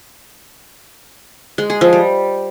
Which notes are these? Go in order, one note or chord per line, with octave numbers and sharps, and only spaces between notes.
G#3
G#4
F3
G3